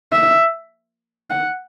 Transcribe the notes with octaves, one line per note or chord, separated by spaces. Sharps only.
E5
F#5